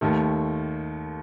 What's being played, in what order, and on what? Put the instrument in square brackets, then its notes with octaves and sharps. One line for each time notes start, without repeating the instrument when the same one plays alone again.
[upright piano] D#2 D#3 A3